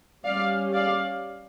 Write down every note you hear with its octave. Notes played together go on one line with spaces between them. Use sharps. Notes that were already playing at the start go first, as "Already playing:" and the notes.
G3 C#4 D5 F5
D5 F5